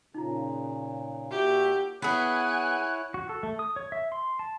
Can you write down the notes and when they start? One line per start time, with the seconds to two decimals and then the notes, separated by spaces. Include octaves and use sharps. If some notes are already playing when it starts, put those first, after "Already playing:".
0.14 A#2 C#3 D#4 F4 A#5
1.31 A#2 F#4 G4 E5
2.02 B3 E4 G#4 C#5 F#5 G#5 F#6
3.14 F#4
3.29 A4
3.43 A3
3.59 D#6
3.76 C#5
3.92 E5
4.12 C6
4.39 A5